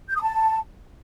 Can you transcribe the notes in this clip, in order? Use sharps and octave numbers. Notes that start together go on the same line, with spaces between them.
G6
D#6
A5